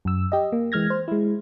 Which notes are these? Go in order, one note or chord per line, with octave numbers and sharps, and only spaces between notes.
F#2 E6
G4 D#5
A#3
E3 G#3 F6 G#6 A#6
C5
G#3 E4